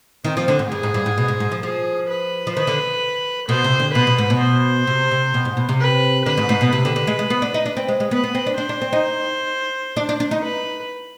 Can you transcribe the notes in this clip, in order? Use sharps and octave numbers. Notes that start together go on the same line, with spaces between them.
D#3 C4
F3
D3
G#2
G2 G#4
G#2
G2
G#2
B2
G#2
G#2
F3
F3 G#4
B4
F3
D#3 B4
D3
B2 C5
C3
D3
B2 B4
B2
G#2
B2
C5
C3
C3
B2
G#2
B2
C3
B4
D3 B4
G#2
G#2
B2
C3 B4
D3
D3
G#3
G#3
B3
D4
D#4
D4
C4
G#3
G#3
B3 B4
B3
C4
D4
D4 C5
D4
C4
D#4
D4
D4
D4
D#4
B4